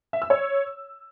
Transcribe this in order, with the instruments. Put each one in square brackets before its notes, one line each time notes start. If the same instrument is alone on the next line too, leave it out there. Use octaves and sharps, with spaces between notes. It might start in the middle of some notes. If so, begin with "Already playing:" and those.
[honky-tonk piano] E5
E6
C#5